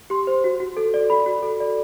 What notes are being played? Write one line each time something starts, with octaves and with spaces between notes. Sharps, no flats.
G4 C6
C5
F#4
F#4
A4
D5
F#4 B5
F#4
A4
D5